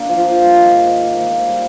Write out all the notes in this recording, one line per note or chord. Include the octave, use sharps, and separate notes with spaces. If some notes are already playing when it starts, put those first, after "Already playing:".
Already playing: A#3 D4
F3
F3
G3
D#3
G#2
G#2
F4
A#3
C5
G3